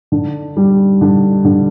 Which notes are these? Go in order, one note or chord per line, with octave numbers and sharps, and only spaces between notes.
D3
G3
D3
D3